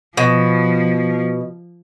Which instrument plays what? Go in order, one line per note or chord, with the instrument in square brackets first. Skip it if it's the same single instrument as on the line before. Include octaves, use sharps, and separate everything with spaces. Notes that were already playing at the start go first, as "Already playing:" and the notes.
[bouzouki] B2 [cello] F3